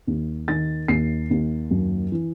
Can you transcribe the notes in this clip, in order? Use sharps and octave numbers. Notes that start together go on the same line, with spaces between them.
D#2
D#3 A6
D#2 C7
D#2
F#2
E3